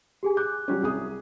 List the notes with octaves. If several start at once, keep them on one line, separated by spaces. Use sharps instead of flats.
G4 G#4 G#5
D6 F#6 G6
F#3 G3 C#4
C2 G#4 D#6